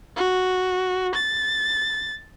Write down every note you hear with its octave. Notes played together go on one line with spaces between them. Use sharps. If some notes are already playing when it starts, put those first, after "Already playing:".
F#4
A6